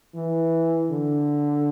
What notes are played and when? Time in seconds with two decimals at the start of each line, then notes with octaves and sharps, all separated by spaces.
0.15 E3
0.91 D3